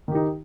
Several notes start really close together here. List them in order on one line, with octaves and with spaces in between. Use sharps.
D#3 G4 D#4